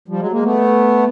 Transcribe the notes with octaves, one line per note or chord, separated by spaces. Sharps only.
F3 G3
F#3 G#3
G#3 A#3
A3 B3